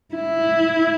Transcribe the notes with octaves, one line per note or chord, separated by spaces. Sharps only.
E4